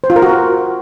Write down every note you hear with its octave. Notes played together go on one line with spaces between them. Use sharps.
C5
F4
A#4
F#4
A#4